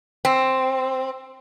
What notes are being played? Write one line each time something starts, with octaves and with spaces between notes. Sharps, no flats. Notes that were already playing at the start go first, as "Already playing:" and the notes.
C4